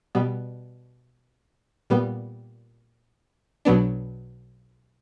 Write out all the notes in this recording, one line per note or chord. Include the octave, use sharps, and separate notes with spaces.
B2 G3 B3
A#2 G3 B3
B1 B2 F#3 B3 D4